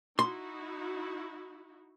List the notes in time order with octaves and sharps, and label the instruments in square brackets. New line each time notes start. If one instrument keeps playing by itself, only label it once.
[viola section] D#4 E4 F#4 [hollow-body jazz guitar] C6